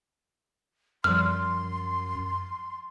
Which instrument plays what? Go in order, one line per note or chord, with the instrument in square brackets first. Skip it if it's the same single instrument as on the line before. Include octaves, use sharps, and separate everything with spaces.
[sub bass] F#2 [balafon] F3 G3 [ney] C6 [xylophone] F6